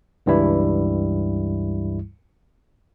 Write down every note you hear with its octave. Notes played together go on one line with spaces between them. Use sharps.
C#2 G2 E3 G3 E4